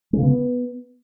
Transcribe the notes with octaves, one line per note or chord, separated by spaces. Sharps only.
G#3
C#3
B3